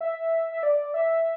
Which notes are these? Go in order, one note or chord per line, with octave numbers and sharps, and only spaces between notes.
E5
E5
D5
E5